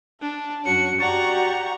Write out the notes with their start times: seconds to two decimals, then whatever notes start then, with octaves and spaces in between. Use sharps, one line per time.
0.21 D4 A5
0.65 F#2 F#3 F#4 C#7
1.00 F#4 G4 D5 F#5 A#5 C#6